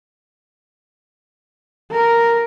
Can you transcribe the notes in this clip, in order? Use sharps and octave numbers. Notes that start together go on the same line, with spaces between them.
A#4